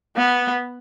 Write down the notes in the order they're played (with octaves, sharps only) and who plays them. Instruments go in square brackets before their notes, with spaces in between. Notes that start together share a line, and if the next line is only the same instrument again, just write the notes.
[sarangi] B3